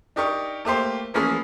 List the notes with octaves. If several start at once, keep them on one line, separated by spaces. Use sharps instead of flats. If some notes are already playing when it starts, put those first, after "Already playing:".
D4 D#4 G4 A#4 C#6
A3 A#3 G4 C5
E3 F3 A#3 C#4 G#4 B4